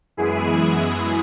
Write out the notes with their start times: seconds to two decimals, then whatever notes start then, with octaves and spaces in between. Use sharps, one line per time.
0.17 F#2 E3 G#3 B3 E4 G#4